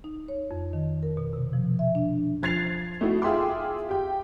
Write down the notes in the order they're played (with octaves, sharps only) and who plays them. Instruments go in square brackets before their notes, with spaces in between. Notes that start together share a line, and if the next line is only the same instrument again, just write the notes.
[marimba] D#4
C#5
F2
D#3
A#4
B2
C3
F3
E5
D4
[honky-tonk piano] F3 G#6 A6 C7 F7
A3 D#4 E4 F#4
F4 G#4 E5 G5 C6 D6
G4 G5